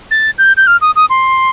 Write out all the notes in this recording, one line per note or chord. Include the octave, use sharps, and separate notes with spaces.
A6
G6
G6
F6
D#6
D#6
C6